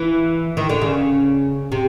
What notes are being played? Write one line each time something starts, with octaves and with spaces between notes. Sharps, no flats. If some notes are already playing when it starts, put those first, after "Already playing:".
Already playing: E3
D#3
D3
C#3
C3